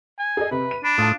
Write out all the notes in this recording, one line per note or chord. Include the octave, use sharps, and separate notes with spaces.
G#5
G#4 A4 D#5
C3 B4
D#7
D4 B5
A2 F4 F5 A5 D#6